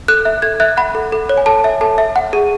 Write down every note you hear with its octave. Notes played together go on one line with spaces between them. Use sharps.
A4 F#6
E5
A4 G#6
E5 F#6
F#5 B5
A4
A4
C#5
G#5
A4 A5
E5
A4 A5
E5
F#5
G#4